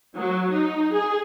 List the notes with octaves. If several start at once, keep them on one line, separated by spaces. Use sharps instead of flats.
F#3
D#4
G#4